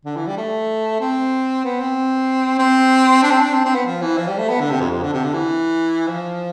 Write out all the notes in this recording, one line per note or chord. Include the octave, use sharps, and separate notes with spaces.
D3
E3
G3
A3
C4
B3
C4
C4
D4
C4
D4
C4
C4
B3
F3
E3
F3
G3
A3
B3
D3
C3
F2
F2
D3
C3
D3
E3
F3